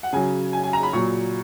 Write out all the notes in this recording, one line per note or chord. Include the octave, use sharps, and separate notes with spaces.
F#5
C#3 F#3 G#5
G#5
G#5
A#5
B5
A#2 F#3 C#6